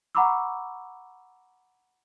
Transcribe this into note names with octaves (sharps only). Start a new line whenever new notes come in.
F#5 A#5 B5 C#6 D6 E6